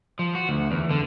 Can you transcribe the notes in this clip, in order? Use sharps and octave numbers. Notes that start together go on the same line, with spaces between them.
F3
F#4
D2
E2
D3